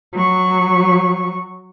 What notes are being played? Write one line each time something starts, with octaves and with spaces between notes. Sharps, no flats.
F#3 C#6